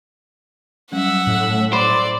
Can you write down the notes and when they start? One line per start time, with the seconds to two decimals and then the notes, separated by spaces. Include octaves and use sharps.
0.92 F#3 G3 C#4 E5 F#5
1.27 A2
1.73 C5 D5 B5